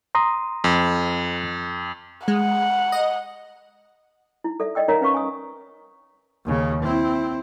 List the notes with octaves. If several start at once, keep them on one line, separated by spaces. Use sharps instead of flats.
A#5 C6 D#6
F2
G#3 F#5
D#5
D#4 E4
A4 D5 E5
D5 D#5 G5 E6
D#4 A#4 C#5 E5 F5 A#5
C#4 B4 F5 C#6
G#5 D#6
D#2 C#3
C4 E4